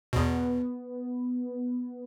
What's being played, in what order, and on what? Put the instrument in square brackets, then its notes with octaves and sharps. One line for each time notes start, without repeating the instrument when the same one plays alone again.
[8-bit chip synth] E2 B2 [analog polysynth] B3